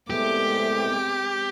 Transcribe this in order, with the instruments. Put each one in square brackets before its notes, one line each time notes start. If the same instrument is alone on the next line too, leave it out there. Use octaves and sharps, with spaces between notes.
[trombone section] C2 A3 [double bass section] G#3 B3 C4 [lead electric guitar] G4 [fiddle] D6